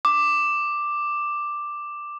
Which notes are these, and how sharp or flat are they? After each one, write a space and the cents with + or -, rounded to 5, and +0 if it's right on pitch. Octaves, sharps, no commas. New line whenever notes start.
D6 +5